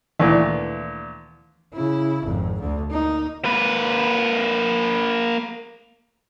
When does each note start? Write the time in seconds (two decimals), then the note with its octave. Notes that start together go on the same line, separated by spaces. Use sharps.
0.20 D2 A#2 D#3 E3
1.74 C#3 E4
2.24 G#1 F2
2.60 D2 D3
2.91 A#3 D#4
3.45 A#3 B4